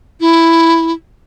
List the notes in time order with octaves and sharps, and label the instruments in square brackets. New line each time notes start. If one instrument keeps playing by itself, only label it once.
[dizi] E4